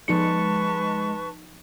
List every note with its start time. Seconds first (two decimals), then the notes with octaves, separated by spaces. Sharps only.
0.08 F3 G#3 D#4 B4 A5 C#6 C#7